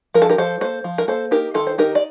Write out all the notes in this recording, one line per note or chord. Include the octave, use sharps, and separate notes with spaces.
F3 A#4
A4
G4 A#4
F3 A4 C5
A#3 A4 C5
F3
A#4
A#3 A4 C5
D#4 G4 A#4
D#3 F4 A4
C5
D#4 G4 A#4
D5